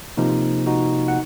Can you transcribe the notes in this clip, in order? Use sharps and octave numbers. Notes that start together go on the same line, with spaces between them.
C3 F3 A#3 D#4
D#4 F#4
F#5